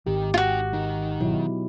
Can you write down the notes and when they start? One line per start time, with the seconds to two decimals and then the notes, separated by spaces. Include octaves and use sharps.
0.07 G#1 D#3 G4
0.34 D#4 F4 F#4 G5
0.73 D#3 D#4
1.20 B2 F#3 E4